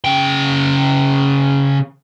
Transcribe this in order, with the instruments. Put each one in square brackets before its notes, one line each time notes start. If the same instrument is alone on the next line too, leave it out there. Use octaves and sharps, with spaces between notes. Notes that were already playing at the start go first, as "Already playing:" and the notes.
[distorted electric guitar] C#3 G5